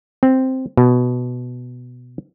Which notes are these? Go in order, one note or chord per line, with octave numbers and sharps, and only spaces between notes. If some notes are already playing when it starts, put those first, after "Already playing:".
C4
B2